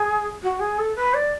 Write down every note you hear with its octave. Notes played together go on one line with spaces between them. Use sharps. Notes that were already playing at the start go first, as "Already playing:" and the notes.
Already playing: G#4
F#4
G#4
A4
B4
D5